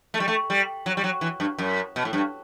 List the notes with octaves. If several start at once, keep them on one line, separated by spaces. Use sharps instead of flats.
A3
G3
A3
G3
F#3
G3
F#3
E3
G2
F#2
B2
A2
G2